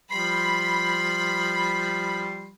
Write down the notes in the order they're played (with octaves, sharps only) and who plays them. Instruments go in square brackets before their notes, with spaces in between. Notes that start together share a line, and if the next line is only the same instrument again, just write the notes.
[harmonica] F3 G3 [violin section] B5 [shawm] C6